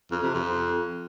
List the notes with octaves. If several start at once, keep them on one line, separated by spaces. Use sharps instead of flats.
F2
C3
F2